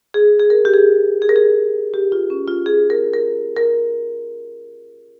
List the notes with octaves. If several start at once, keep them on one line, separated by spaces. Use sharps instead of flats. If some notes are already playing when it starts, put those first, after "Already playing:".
G#4
G#4
A#4
G4
G#4
G#4
A#4
G#4
G4
F4
C#4
F4
G#4
A#4
A#4
A#4